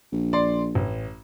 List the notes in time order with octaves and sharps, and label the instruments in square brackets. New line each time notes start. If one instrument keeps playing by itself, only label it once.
[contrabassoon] A#1
[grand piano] D5 C6
A1